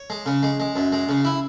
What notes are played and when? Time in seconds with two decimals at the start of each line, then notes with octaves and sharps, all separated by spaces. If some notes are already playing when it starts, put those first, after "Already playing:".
Already playing: C#5
0.10 G#3
0.26 C#3
0.43 G#3
0.60 G#3
0.76 F#2
0.92 G#3
1.09 C#3
1.25 E4